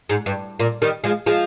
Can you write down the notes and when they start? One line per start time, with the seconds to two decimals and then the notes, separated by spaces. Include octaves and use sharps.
0.09 G#2
0.26 G2
0.59 A#2
0.82 D#3 G3
1.04 F3 G#3
1.26 F3 G#3